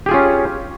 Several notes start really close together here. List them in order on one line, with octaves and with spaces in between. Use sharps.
G4 G#4 F4 C#4